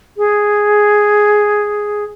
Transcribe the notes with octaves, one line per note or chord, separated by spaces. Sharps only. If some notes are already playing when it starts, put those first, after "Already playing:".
G#4